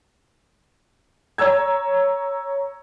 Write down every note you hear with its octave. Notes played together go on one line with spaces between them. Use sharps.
C#5 A#5 E6 G#6